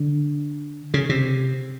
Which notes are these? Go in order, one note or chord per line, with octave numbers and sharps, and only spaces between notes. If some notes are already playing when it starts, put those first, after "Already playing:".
Already playing: D3
C#3
C3